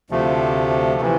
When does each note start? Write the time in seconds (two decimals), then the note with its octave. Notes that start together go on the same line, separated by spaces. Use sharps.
0.10 D2 C3 F3 A3
1.01 C3 E3